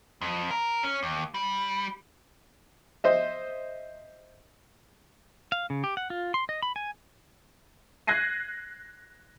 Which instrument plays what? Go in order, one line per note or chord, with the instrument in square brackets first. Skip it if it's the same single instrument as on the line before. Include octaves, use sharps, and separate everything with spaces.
[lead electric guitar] F2
A#4
C#4
D#2
G3
[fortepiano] C5 D#5 E5
[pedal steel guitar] F5
C#3
G4
F#5
F4
C6
D#5
B5
G#5
[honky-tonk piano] F#6 G#6 A#6 C7 D#7